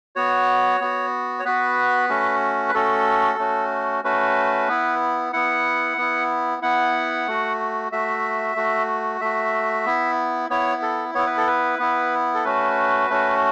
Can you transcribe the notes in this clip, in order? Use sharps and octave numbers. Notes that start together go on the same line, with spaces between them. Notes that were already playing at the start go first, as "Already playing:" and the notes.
B3 F#4 C#5
B3 F#4
C#5
B3 F#4 B4
A3 C#4 F#4
B4
A3 C#4 F#4 A4
A3 C#4 F#4
A3 C#4 F#4 B4
B3 E4
B3 E4 F#5
B3 E4
B3 E4 F#5
A3 F#4
A3 F#4 E5
A3 F#4
A3 F#4 E5
B3 E4
B3 E4 C#5
A4
B3 E4 C#5
B4
A4
B4
B3 E4
A4
A3 C#4 F#4 B4
A3 C#4 F#4